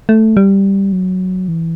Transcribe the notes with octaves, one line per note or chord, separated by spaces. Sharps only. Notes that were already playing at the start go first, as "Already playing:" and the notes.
A3
G3
F#3
E3